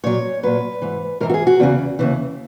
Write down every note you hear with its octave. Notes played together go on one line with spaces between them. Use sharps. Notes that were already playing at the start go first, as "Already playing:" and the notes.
A#2 F#3 C#5
A#2 F#3 B4
G#2 E3
G#2 E3 A#4
F#4
G#4
F#4
E2 C#3 E3
D#2 C#3 E3